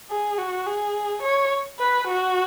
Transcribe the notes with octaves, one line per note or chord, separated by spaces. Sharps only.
G#4
F#4
G#4
C#5
B4
F#4